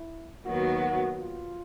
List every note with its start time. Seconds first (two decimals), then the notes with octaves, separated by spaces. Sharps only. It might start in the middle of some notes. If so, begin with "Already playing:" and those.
Already playing: E4
0.46 D#2 D#3 F#3 B3 F#4
1.20 F4